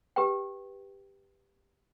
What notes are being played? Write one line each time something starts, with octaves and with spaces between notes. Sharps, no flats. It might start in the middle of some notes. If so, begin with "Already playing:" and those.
G4 B4 G5